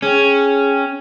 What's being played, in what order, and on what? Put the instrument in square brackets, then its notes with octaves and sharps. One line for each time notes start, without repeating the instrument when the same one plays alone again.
[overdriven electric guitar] C#4 [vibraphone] G#4 C#5 G5